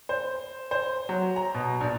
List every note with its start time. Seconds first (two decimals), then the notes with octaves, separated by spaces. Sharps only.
0.09 C5
0.71 C5
1.09 F#3
1.36 A#5
1.54 B2
1.81 A#1